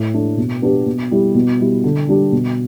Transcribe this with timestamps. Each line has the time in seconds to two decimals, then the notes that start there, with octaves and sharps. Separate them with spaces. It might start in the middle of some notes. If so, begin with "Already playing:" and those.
Already playing: A2
0.14 A3 D4
0.37 B2
0.62 B3 D4 G4
0.86 B2
1.11 G3 E4
1.35 B2
1.60 G3 E4
1.84 D3
2.08 G3 D4 G4
2.32 B2